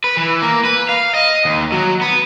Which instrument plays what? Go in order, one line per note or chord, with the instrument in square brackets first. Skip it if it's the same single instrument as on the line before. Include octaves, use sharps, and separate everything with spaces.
[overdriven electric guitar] B4
E3
A#3
B4
F5
D#5
D#2
F#3
B3